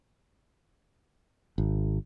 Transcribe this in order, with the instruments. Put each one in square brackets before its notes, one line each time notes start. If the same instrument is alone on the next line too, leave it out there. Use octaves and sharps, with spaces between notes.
[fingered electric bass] G#1